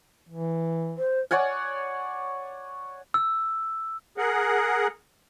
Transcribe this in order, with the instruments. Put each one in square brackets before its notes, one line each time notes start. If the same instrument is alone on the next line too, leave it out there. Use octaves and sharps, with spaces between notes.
[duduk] E3
[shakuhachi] C5
[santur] C#5 D5 F#5 G#5
[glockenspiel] E6
[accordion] G#4 A#4 F#5